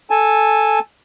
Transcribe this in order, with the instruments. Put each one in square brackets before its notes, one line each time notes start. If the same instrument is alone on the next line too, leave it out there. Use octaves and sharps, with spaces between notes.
[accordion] A4 G#5 A5